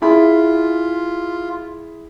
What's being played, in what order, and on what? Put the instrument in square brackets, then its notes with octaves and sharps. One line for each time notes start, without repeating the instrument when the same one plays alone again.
[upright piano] E4 G#4 B5 [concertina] F4